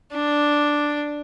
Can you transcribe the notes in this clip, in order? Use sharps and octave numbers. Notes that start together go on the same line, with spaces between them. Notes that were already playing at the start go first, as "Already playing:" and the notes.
D4